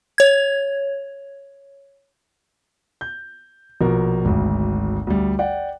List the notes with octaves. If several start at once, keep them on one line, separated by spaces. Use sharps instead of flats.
C#5 G#6
G6
A#1 B2 A#4
G#1 D2
D2 G3
D5 F#5 G5